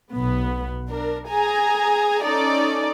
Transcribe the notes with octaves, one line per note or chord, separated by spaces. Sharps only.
B1 B3
D4 A#4
G#4 G#5 A#5
C#4 D#4 A4 D5